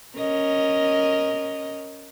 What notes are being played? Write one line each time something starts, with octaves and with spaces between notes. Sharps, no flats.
C#4 A#4 D#5